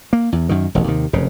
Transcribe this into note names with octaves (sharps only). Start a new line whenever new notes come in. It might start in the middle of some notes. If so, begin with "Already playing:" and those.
A#3
E2
F#2 D#3
E1 A1
D#2 C3 D#3
F1 F#2 C#3